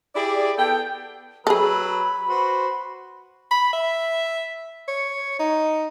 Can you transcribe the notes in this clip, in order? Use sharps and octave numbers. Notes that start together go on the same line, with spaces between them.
E4 G4 G#4 D5
B3 A4 G5
F#3 G#4 A4 B4 B5 E6
F#4 B4 C5
B5
E5
C#5
D#4